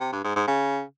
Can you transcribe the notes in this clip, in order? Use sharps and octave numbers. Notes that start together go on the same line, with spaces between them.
C3
G2
G#2
G#2
C#3